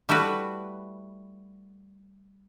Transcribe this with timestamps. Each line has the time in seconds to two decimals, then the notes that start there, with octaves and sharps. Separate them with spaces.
0.09 G3 A3 E4 F#4 B4